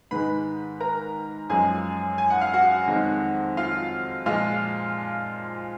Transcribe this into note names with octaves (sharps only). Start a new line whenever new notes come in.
G#2 D#3 G#3 B4 B5
A#4 A#5
F#2 F3 G#3 G#4 G#5
G#5
F#5
F5
F#4 F#5
F2 D#3 G#3
F4 F5
A#2 F3 G#3 F4 F5